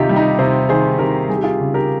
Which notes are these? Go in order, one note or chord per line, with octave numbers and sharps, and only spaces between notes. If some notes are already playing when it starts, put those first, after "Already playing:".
Already playing: C3 D#3 D#4 F4 G4
G3
D#4 G4
C3 C5 D#5
D#3 G#4 C5
C3 G4 A#4
G3 G#4
G4
F4 G#4
C#3
G4 A#4